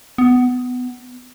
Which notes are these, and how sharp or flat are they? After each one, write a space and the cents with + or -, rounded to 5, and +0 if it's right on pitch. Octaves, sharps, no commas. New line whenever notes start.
B3 +15